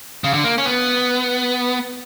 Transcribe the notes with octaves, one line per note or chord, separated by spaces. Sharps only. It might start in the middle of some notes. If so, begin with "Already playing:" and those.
C#3
D3
A#3
C#4
B3